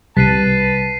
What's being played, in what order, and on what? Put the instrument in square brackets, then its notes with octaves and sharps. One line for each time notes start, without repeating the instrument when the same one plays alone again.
[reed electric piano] C2 [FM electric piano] G3 [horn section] B4 A5 [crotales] B6 C7 D#7